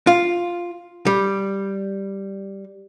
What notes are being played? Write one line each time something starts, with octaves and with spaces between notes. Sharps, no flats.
F4
G3